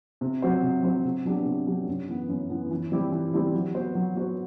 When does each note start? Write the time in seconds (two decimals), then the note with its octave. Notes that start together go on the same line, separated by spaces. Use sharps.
0.21 C3
0.42 F#3 C4 F#4 C5
0.63 C3
0.83 F#3 C4 F#4 C5
1.05 C3
1.25 F#3 B3 D4 G4
1.45 C3
1.66 F#3 B3 D4 G4
1.87 F#2
2.08 E3 B3
2.29 F#2
2.50 E3 B3
2.71 E3
2.92 G3 C4 E4 G4
3.12 E3
3.33 G3 C4 E4 G4
3.54 F#3
3.75 B3 F#4 C5
3.95 F#3
4.16 B3 F#4 C5